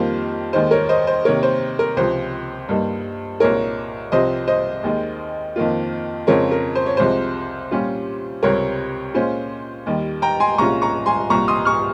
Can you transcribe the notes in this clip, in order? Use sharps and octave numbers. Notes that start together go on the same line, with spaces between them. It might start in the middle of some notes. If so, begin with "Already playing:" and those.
Already playing: F2 D#3 G3 A#3 F4 C5
D#2 D#3 G#3 D#4 C5
A#4 C#5
C5 D#5
C5
C3 D#3 A#3 A#4 C#5
C5
A#4
C#2 C3 F3 C5
G2 G3 A#3 D#4
C2 A#2 G#3 D#4 A#4 C#5
C2 C3 F3 C4 C5 D#5
C5 D#5
D#2 D#3 G#3 D#4
F2 D#3 A#3 F4
F2 C#3 G#3 C4 F4 A#4 C#5
A#4
C5
C#5
C2 C3 F3 G#3 C5
A#2 G3 C#4 F4
C#2 C3 G3 C4 A#4 C#5
A#2 G#3 C#4 F4 C5
D#2 D#3 G3
G5 A#5
G#5 C6
C2 A#2 G#3 C#4 F4 A#5 C#6
A#5 C#6
G#5 C6
C2 A#2 G3 A#5 C#6
C6 D#6
C#6 F6